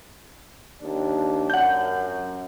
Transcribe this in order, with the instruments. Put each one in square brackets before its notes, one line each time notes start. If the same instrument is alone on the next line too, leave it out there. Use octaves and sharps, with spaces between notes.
[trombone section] D#2 D4
[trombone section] F#2 [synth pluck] F#5 G6